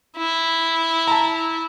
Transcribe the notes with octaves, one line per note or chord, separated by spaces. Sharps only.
E4
A5 A#5